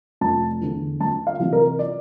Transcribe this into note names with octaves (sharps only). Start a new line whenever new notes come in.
F1 A5
E2 D3
D2 A5
F5
C3 E3
A#4
D5